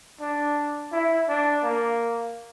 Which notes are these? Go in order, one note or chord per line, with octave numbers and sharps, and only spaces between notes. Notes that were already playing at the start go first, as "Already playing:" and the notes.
D4
E4
D4
A#3